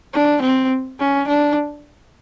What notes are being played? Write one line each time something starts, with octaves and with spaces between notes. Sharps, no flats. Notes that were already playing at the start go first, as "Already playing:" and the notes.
D4
C4
C#4
D4